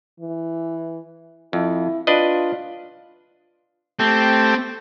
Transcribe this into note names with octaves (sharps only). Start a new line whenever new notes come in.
E3
F2 E4
D4 F4 B4 D#5
A3 C4 G4